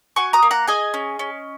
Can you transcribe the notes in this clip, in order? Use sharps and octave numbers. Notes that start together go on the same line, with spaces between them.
F#4 G#5 C#6
A#5 D#6
A#3
F#5 A#5
G#4 D#5 G#5
C#4
C#4